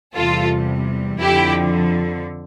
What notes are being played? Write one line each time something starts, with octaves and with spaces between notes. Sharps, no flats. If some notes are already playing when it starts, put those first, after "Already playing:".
E2 C3 G3 F4 A4
F2 D3 F3 E4 G4